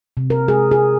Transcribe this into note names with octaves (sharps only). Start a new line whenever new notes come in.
C3
A#4
G#4
G#4